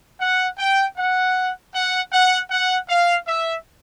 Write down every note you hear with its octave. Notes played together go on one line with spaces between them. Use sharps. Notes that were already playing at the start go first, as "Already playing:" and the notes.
F#5
G5
F#5
F#5
F#5
F#5
F5
E5